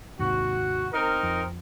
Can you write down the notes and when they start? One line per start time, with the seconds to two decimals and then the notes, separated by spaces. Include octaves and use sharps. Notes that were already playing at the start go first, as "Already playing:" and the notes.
0.19 D#2 G#2 C3 F#4
0.93 C4 D#4 A#4
1.23 F2